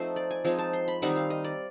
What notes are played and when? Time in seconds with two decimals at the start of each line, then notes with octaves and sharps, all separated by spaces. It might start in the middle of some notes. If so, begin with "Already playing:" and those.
Already playing: F3 A3 C4 D#4 C5
0.16 D5
0.31 G#5
0.44 F3 G#3 C4 D#4 G#5
0.59 A5
0.73 C6
0.88 B5
1.02 D#3 G3 C4 D#4 F#5
1.16 F5
1.30 D#5
1.44 D5